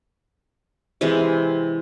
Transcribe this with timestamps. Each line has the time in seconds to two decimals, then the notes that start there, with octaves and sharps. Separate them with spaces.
1.01 C3 E3 G#3 E4